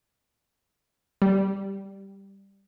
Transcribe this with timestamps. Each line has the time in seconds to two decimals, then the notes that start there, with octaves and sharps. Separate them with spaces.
1.22 G3